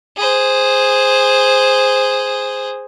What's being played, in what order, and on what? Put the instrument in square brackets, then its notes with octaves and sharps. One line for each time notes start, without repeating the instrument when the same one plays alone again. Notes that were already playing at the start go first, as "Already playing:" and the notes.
[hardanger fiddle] G#4 C5